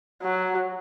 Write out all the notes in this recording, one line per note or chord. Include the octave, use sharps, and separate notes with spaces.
F#3